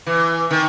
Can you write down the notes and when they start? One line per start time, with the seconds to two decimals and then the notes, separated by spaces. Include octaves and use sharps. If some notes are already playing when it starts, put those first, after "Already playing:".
0.07 E3
0.51 D#3